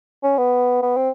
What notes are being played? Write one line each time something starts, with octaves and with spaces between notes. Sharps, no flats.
C#4
B3
B3
C4